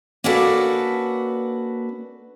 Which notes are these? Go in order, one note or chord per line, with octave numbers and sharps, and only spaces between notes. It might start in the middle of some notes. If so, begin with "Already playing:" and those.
A#3 C#4 D4 F#4 A4 B4